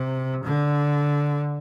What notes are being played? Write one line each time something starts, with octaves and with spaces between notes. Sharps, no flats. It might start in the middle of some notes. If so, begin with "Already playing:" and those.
Already playing: C3
D3